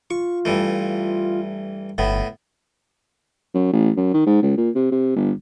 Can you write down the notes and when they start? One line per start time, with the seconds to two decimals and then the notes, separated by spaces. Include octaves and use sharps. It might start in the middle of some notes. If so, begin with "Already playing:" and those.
0.11 F4 C#6
0.45 G2 E3 A3
1.98 G1 A2 B3
3.55 F#2
3.73 A1
3.97 F#2
4.14 D#3
4.27 G#2
4.43 C#2
4.57 A#2
4.75 C3
4.92 C3
5.16 G1